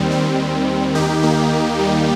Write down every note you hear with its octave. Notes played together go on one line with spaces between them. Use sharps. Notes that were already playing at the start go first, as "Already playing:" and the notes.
Already playing: D#2 D#3 G3 C4
G3 C4
D#2 D#3 D#4 G4
A#3 D#4
G3